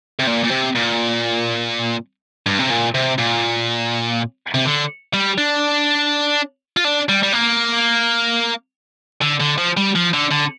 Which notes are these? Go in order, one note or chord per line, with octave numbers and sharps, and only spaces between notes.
C3
A#2
A#2
C3
A#2
G2
C3
A#2
C3
A#2
C3
D3
G3
D4
F4
D4
G3
G3
A#3
D3
D3
F3
G3
F3
D3
D3